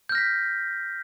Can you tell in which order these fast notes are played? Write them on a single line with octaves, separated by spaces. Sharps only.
G6 F6 A#6 B6